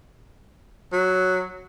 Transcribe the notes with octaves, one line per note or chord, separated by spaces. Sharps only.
F#3